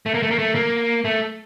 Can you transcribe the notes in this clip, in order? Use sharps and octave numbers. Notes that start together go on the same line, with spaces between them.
A3
A#3
A3
A#3
A3
A#3
A3